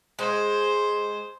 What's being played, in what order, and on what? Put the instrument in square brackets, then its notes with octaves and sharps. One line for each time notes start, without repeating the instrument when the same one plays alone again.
[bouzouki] G#3 [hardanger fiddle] C5